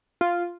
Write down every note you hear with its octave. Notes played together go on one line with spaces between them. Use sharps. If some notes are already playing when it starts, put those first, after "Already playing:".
F4